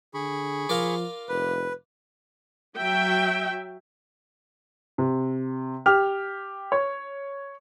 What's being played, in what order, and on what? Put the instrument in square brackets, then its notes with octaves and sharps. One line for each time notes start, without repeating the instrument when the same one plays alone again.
[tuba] D3 [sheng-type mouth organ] G#4 B5 C#6
[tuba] F3 [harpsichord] F4 A#4 D5
[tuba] F1 [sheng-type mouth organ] B4
[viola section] F#3 E5 G5
[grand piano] C3
G4 F6
C#5